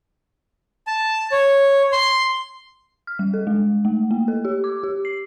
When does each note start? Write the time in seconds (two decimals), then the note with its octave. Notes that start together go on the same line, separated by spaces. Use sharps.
0.87 A5
1.32 C#5
1.92 C6
3.07 F6
3.19 G3
3.34 A4
3.47 G#3
3.85 A3
4.11 A#3
4.28 A4
4.45 G4
4.64 D6
4.83 G4
5.05 C7